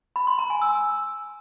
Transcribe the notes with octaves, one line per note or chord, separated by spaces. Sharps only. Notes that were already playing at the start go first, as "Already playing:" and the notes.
B5
C6
A#5
G#5
E6